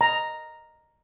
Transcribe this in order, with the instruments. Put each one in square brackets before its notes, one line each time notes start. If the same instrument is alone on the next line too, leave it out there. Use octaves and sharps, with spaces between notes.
[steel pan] A#5